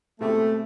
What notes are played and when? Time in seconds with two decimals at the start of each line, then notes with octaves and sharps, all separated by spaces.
0.21 B2 G#3 A3 C4 E4 G4